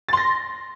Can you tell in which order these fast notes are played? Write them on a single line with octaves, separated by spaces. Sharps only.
A6 C6 A#6